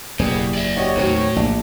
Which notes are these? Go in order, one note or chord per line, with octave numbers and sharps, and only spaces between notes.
F#1 E2 B2 G3 G#4
D5 E5
F#4 G4 C#5 D#5
D#2 A2 F#3 C4
A#1 D4